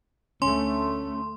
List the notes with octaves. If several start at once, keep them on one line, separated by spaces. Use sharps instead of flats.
D2 A3 C#4 C6